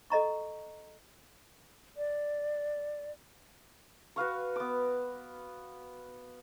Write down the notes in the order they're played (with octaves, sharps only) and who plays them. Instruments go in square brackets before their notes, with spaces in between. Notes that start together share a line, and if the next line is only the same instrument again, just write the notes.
[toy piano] A4 D#5 A#5 C#6
[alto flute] D5
[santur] F#4 B4 F5 C#6
B3 D6